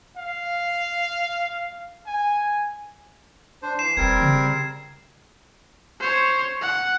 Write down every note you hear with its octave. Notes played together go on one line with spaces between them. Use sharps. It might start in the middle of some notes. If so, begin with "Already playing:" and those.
F5
G#5
D4 C5
E3 C7 E7
E1 G3 C4 A#4 G#6
C#3
C5 C#5
F#5